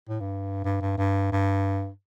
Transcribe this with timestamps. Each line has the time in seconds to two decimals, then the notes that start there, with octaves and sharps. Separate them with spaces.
0.09 A2
0.20 G2
0.64 G2
0.81 G2
0.98 G2
1.32 G2